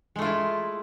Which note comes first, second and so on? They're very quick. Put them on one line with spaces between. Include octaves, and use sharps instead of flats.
G#3 A3 F4 E4